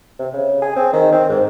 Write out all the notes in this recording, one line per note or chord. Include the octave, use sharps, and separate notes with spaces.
C3
C#3
G#4
C4
D#3
C4
G#2